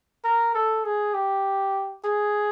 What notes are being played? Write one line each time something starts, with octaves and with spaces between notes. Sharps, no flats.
A#4
A4
G#4
G4
G#4